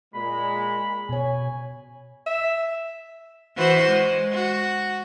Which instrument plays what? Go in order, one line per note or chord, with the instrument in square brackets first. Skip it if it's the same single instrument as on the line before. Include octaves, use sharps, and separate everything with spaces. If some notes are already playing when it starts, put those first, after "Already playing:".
[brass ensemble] A#2 G#3 [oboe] B5
[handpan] B2 C#5 [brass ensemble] G#5
[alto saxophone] E5
[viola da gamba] E3 F#4 C5
G#3
F#4